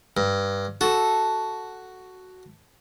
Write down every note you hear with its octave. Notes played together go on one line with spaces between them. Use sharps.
G2
F#4 A4